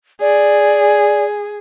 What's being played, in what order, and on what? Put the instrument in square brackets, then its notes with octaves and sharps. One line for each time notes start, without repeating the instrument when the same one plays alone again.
[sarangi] G#4 [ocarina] D5